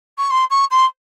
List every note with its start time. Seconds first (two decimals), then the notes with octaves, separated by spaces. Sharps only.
0.18 C#6
0.30 C6
0.50 C#6
0.70 C6